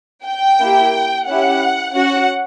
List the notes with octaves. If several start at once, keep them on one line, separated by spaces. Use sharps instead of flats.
G5
A#3 E4 G4
C#4 E4 G4 F#5
C#4 F#4 F#5